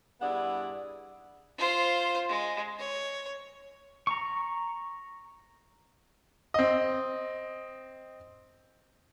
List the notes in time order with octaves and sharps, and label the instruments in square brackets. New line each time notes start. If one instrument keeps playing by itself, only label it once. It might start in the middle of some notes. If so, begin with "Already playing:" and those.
[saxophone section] G2 B3 E4 G#4 D5 F#5
[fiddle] F4 C5
G#3
C#5
[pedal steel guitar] A#5 C#6
[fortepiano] C4 D#5